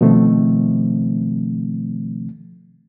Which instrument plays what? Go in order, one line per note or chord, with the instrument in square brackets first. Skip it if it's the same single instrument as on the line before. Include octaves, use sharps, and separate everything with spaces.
[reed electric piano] B2 D#3 F3 A3 C4